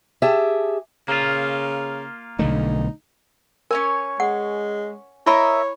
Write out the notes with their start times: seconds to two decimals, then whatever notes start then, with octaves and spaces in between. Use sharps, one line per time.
0.22 G4 G#4 E5 A5
1.08 C#3 A#3 F4
2.39 B1 D3 A3 D#4
3.71 C#4 A#4 C#5 G#5
4.20 G#3 F#5
5.26 E4 A#4 C#5 D#5 E5 B5